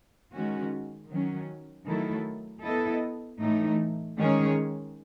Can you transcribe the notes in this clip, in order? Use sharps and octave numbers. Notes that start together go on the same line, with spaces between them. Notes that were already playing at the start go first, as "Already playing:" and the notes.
D#3 G#3 C#4 F#4
D#3 F#3 C#4
D#3 F#3 A3 E4 A4
B3 E4 A4 D#5
A2 E3 A3 D#4
D#3 G#3 C#4 G#4 C#5